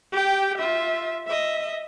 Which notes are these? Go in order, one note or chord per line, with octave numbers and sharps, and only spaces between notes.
G4 G5
F4 E5
D#5 E5